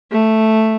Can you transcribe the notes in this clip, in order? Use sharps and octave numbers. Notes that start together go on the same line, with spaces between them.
A3